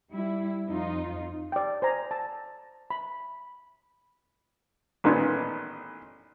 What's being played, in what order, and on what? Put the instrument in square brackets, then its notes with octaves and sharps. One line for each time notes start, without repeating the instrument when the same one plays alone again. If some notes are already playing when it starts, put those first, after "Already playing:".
[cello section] G3 E4
F2 D#4 F4
[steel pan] D5 G5
C5 G#5 A#5
A5
B5
[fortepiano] A1 A#2 D#3 B3 C#4 C6